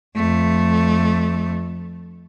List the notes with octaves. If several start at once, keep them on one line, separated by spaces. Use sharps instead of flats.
F2 A3